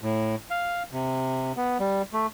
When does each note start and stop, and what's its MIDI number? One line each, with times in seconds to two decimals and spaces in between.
0.01 0.35 45
0.51 0.83 77
0.92 1.52 48
1.57 1.78 59
1.80 2.02 55
2.13 2.27 57